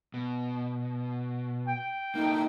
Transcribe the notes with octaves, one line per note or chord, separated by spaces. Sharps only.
B2
G5
A#3 D#4 E4 A4